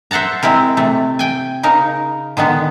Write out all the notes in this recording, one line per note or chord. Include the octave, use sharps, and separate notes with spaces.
C5 E5 F#5 A5 A#5
G#3 C4 E4 A#4
C3 A3
G5 G#5
C#3 D#4 A#4
D3 D#3 G#3 B3